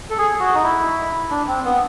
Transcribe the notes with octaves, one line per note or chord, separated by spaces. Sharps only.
A4
G#4
F#4
D#4
E4
D4
C4
B3